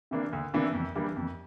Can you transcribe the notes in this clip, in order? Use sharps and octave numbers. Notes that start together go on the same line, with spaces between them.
C3 E3 A#3 D4
D2
C3 E3 A#3 D4
F2
E3 G3 A#3 D4
F2